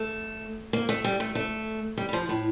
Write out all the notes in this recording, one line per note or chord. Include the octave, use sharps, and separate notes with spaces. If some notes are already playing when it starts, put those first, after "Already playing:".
Already playing: A3
A#3
A3
G3
A3
A3
G3
G3
F3
A2